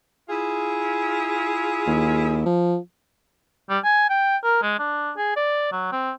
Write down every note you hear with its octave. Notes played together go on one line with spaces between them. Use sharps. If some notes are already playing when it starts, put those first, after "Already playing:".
E4 F4 G#4
D#2
F3
G3
G#5
G5
A#4
G#3
D4
G#4
D5
F#3
C4